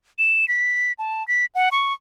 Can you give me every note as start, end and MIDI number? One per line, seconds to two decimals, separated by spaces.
0.18 0.48 100
0.48 0.92 95
0.99 1.26 81
1.28 1.46 95
1.55 1.69 78
1.71 1.93 85